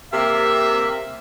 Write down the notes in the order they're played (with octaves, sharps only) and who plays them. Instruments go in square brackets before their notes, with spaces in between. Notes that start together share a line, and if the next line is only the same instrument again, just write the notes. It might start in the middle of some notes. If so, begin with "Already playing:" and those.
[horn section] C3 A#3 E5